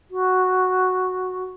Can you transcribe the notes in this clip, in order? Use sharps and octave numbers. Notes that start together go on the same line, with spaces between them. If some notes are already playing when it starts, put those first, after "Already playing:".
F#4